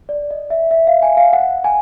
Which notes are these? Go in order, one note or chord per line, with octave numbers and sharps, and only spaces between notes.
D5
D#5
E5
E5
F5
G#5
F5
F#5
G#5